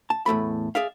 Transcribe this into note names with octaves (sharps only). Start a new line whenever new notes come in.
A5
E2 A2 A3 B5
G#4 D5 E5 F5